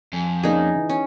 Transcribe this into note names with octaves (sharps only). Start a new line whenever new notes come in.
F2 G#5
A#3 C#4 D#4 G#4 D5
E3
C#4